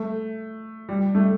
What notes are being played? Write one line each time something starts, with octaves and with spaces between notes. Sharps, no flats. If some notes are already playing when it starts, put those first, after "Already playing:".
Already playing: A3
G3
A3